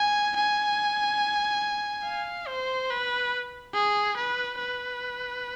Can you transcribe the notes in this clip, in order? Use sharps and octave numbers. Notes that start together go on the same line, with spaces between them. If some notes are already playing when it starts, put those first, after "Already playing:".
Already playing: G#5
G#5
F5
C5
B4
G#4
B4
B4